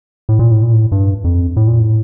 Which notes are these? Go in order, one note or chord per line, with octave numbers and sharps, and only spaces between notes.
A2
A#2
A2
A#2
A2
G2
F2
A2
A#2
A2